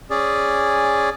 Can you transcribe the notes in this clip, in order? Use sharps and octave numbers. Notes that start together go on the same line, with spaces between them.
C#4 G#4 D5